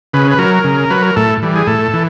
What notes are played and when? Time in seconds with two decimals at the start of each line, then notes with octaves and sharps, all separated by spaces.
0.14 C#3 B4
0.31 B4
0.38 F#3 A#4
0.64 C#3
0.90 F#3 B4
1.02 A#4
1.16 A2 A4
1.42 E3 G3
1.56 G#4
1.67 A2 A4
1.94 E3